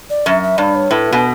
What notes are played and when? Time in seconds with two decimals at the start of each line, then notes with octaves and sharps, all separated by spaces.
0.10 D5
0.26 F#2 E5
0.43 E5
0.58 G2 D5
0.75 C#5
0.91 A2 B4
1.13 B2